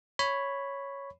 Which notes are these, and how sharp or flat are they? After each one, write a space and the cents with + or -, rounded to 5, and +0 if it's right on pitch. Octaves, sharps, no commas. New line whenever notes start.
C#5 +0 B5 +0